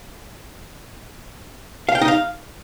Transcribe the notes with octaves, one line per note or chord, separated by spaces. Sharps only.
F5
G5
D#4
F5